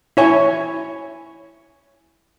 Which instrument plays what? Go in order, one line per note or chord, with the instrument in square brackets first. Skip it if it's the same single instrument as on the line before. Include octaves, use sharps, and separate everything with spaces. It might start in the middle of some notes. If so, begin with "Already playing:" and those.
[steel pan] E4 C#5 G#5